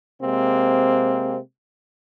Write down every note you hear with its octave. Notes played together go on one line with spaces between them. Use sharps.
C3 G#3 A#3 C4